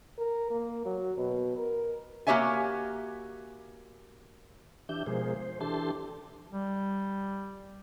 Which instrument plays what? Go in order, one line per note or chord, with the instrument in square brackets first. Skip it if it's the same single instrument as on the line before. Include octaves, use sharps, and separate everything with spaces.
[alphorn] A#4
A#3
F#3
B2
A#4
[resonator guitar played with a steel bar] A#3 F#4 G4 C#5 E5 G#5
[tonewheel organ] E3 D4 G4 E5 G6
B2 F3 G#3 G#4 A#4 C5
C5
E3 D4 G4 A4 A5 C6
[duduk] G3